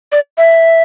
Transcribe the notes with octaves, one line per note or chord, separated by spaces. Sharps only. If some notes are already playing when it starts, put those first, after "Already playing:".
D5
E5